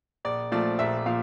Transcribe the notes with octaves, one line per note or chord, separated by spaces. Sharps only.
A#1 D5
A#2 F3 A3 D5
A#1 E5
A#2 F3 F5